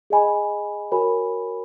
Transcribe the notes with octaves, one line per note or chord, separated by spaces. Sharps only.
G#4 D#5 G#5 B5
F#4 A#4 C#5 G#5 B5